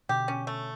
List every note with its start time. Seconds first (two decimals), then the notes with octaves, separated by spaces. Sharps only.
0.09 B2 D3 G4
0.28 C#4
0.47 A3